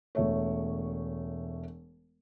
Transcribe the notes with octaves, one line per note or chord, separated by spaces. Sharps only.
E1 A3 C#5